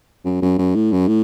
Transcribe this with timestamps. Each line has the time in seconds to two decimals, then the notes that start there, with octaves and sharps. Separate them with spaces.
0.25 F#2
0.42 F#2
0.58 F#2
0.75 A2
0.92 F#2
1.08 A2